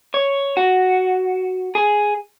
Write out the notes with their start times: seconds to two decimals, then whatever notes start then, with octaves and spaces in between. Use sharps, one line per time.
0.14 C#5
0.57 F#4
1.75 G#4